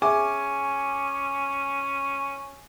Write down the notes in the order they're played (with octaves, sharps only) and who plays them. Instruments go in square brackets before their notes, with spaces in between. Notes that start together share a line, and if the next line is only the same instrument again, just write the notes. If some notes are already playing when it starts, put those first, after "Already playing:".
[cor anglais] C#4 [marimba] G#4 E5 [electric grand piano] G#5 [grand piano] D6